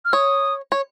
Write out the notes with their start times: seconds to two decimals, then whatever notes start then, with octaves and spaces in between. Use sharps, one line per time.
0.05 F6
0.13 C#5 D#6
0.72 C#5